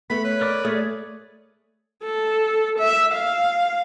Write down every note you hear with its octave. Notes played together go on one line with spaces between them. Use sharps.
A3 B3 B5
B4 C#5
A#4 D5 D6
A3 G#4 C#5 D5
A4
E5
F5